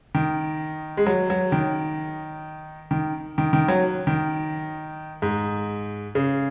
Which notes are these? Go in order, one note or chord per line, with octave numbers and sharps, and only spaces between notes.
D#3
G#3
F#3
F#3
D#3
D#3
D#3
D#3
F#3
D#3
G#2
C#3